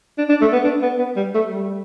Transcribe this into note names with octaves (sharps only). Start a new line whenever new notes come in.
D4
D4
A3
B3
D4
B3
B3
G3
A3
G3